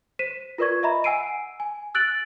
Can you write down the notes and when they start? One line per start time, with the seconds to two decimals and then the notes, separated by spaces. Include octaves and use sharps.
0.19 C5 B6 D#7 E7
0.58 F4 A#4 B4 D5 C#6 G#6
0.83 D#5 E5 A#5 B5
1.04 F#5 G#5 E6 C7 D7 D#7
1.60 G#5
1.95 E6 F#6 A6 D7 F#7